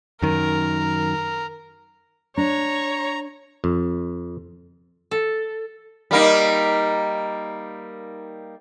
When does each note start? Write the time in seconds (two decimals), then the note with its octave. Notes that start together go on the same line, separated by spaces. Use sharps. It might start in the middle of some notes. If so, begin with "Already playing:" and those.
0.22 F#2 D#3 A#4
2.37 D4 C#5 A#5
3.64 F2
5.11 A4
6.11 G3 A#3 D#4